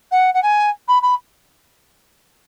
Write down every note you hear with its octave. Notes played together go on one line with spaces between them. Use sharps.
F#5
F#5
G#5
B5
B5